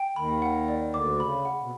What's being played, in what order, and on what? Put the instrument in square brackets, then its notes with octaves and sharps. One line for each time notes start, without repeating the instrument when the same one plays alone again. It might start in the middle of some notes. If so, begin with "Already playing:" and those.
Already playing: [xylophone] G5
[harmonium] D#2 D#3 [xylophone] B5
[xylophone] F#5
D5
[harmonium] D2 D3 [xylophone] D6
[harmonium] C#3 [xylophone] B5
[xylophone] F#5
[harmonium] B2